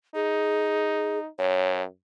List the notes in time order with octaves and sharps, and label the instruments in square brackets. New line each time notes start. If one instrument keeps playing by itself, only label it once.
[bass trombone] D#4 [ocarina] G#4
[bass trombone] F#2 [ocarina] C#5